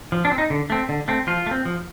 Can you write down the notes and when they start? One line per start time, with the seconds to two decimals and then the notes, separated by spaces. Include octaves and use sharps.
0.12 F3
0.25 D4
0.31 C4
0.38 D#4
0.50 D3
0.70 A3 C4
0.89 D3
1.08 A3 C4
1.27 F3 F4
1.47 A3
1.51 C4
1.65 F3